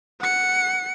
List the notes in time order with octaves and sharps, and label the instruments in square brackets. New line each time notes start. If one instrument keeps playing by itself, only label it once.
[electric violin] F#5 C#7